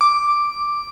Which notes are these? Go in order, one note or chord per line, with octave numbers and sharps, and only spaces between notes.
D6